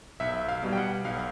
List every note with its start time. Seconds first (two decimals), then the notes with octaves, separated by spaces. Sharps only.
0.20 B1 E5
0.48 F5
0.63 B2 G3
0.73 G5
0.77 F#5
1.05 B1 F5